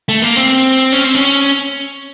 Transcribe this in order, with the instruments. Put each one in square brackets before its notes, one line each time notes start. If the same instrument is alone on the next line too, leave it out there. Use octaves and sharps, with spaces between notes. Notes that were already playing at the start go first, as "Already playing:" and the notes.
[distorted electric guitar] A3
A#3
C4
C#4
C4
C#4